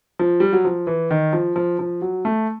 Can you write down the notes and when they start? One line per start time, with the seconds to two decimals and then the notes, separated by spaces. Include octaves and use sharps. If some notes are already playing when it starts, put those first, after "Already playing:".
0.19 F3
0.40 G3
0.53 F#3
0.65 F3
0.87 E3
1.11 D#3
1.33 F3
1.56 F3
1.79 F3
2.02 F#3
2.25 A3